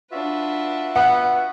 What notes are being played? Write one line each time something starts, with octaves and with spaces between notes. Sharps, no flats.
D4 F4 F#4 B4 E5
B3 F#5